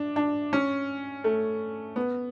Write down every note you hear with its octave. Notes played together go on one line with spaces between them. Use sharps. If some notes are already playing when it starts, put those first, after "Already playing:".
Already playing: D4
D4
C#4
A3
B3